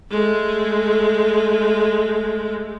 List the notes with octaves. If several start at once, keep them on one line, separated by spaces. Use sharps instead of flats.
G#3 A3